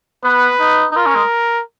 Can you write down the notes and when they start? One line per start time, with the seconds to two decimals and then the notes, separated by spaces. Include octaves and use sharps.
0.24 B3 B4
0.60 D#4
0.92 D#4
0.96 F4 A#4
1.06 C#4
1.15 G#3